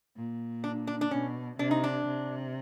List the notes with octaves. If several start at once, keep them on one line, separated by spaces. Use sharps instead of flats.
A#2
D4
D4
D4
B2 C#4
C3 D4
D#4
D4
C3